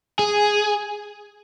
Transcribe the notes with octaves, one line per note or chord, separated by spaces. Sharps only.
G#4